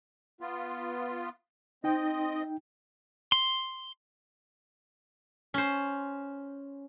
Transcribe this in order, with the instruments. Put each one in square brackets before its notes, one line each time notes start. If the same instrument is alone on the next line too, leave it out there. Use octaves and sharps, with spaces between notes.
[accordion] B3 F4
[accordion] C4 D#5 [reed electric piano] D#4 G5
[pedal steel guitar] C6
[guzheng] C#4 C5